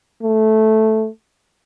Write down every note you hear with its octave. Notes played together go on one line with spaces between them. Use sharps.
A3